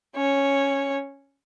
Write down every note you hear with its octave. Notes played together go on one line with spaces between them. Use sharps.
C#4 C#5